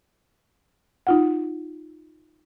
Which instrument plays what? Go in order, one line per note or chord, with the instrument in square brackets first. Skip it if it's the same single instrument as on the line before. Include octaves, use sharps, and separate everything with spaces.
[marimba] D#4 F4 F#5